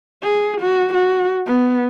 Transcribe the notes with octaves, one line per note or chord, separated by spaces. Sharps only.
G#4
F#4
F#4
B3